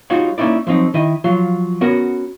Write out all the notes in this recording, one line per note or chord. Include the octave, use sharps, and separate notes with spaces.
G3 D#4 F4 F#4 C#5 F#5
A#3 C#4 D#4 E4 D5
F3 F#3 C4 D#4
D#3 E4 D#5
F3 F#3 F4
B3 C#4 F#4 A#4